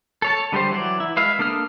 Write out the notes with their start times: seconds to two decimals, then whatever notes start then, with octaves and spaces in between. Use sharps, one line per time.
0.22 A4 C#5 A5
0.52 D3 G3 G4 C5
0.71 E3 F#3 D5
1.00 E4
1.17 G#3 B4 E5 F5
1.39 A#3 D4 A4 D#6 F6